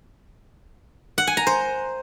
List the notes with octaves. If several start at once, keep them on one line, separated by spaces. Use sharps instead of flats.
F#5
G#5
A#5
C5